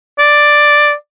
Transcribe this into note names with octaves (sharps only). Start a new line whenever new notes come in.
D5